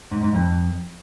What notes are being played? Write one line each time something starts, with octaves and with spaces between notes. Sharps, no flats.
G#2
G#2
F2